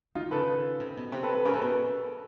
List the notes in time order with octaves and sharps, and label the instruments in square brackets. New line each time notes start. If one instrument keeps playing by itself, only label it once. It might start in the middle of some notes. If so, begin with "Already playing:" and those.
[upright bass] D#3 [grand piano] D#4 F4
[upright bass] C#3 [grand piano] A4 B4
[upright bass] C3
B2
C3
[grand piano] A4 B4
A4 B4
[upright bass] C#3 [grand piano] G#4 A#4
[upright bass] C3 [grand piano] A4 B4
[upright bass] B2